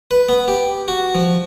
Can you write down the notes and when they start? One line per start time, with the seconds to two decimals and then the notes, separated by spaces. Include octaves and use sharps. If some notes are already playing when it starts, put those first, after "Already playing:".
0.11 B4
0.29 B3
0.48 G4
0.88 F#4
1.15 F3